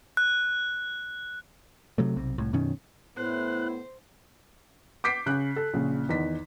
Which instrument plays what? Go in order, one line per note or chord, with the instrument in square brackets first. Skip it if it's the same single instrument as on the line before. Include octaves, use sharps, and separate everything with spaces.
[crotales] F#6
[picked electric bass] C3 F#3 A3
B1 C3
C2 A2
F#2 B2 D#3 C#4
[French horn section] A2 B3 [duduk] E4 [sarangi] C5 [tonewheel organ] F#6
[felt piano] D6 G6 B6 C7 D7
C#3 F#6
A4
A#1 C#3
E2 D#3 B6